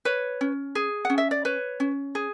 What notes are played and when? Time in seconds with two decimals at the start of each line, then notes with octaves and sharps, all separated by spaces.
0.05 B4 C#5
0.41 C#4
0.75 G#4
1.05 C#4 F#5
1.18 E5
1.31 D5
1.45 B4 C#5
1.80 C#4
2.15 G#4